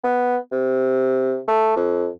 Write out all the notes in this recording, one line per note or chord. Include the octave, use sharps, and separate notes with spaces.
B3
C3
A3
F2